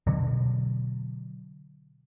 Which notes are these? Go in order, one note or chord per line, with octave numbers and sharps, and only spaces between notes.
B2 D3 F#3